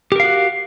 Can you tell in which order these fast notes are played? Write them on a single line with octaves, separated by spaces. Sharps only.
G4 A#4 F5 F#4